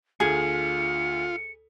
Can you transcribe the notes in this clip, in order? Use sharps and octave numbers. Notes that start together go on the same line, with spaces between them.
D2 F4 G#4 C#7